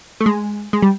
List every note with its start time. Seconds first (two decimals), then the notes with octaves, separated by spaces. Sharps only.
0.21 A3
0.26 G#3
0.73 G#3
0.82 G3